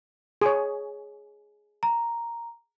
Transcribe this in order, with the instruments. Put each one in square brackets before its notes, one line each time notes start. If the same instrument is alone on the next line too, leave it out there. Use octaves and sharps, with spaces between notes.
[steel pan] G#4 C#5
[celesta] A#5